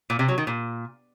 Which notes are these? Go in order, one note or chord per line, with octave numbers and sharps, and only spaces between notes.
A#2
C3
F#3
D#3
A#2